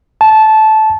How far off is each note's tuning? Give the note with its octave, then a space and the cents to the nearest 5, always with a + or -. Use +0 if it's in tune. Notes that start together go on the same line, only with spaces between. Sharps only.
A5 -15